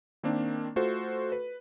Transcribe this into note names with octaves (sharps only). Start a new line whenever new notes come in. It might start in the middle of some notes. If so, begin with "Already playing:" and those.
D#3 A#3 C4 D4
A3 F4 F#4 A4 C5
B4